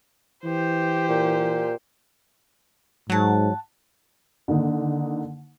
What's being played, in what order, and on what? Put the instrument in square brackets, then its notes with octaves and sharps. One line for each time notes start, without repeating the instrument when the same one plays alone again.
[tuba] E3 [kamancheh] G4 C5
[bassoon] A#2
[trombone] G#2 [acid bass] F#3 [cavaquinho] F#5 A5
[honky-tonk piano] D3 D#3 A#3 D#4